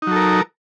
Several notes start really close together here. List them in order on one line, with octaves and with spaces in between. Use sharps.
D#4 F#3 A4 A#4